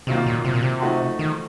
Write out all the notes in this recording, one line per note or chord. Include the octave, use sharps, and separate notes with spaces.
C3 D#3 F#3 A#3 F4
A#2
C3
A#2
C3
F3 A3 D#4 F#4
D#3